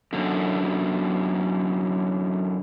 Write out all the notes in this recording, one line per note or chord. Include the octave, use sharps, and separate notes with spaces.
F#2 D3